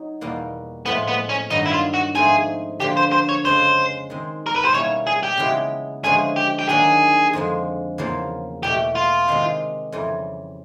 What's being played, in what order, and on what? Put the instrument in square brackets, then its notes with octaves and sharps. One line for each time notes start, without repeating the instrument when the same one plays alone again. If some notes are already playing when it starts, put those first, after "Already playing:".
Already playing: [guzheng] F#3 D#4
E2 B2 G3 A#3
[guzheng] A2 F3 G#3 [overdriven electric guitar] B3
[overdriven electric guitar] B3
C#4
[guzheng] G2 D#3 F#3 B3 [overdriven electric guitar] D#4
[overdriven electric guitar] E4
F4
F#4
[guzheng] G#2 F3 A3 C4 D#4 [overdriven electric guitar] G#4
[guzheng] D3 F3 A#3 D4 [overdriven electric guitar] G4
[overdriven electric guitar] C5
C5
C#5
[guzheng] F2 C#3 F3 G#3 [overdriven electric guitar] C5
[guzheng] D#3 G#3 C4
[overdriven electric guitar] A#4
B4
C5
[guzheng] B2 G3 A#3 C#4 E4 [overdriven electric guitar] C#5
[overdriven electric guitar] G#4
G4
[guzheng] C#3 E3 G#3 B3 E4
[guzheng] D3 F3 G#3 C#4 E4 [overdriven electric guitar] G#4
[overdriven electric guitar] G4
G4
[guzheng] D#3 F#3 A#3 D4 [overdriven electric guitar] G#4
[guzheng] F2 D3 F3 G#3
E2 C#3 F3 A#3
[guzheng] E2 B2 F#3 A3 [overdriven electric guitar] G4
[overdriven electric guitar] F4
[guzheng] C3 D#3 G#3 C4 D#4
F2 C#3 E3 G3